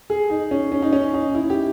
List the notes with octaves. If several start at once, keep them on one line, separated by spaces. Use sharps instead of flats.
G#4
D#4
C#4
C#4
D#4
C#4
D#4
E4
G4